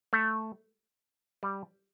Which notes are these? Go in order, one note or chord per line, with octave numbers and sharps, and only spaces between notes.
A3
G3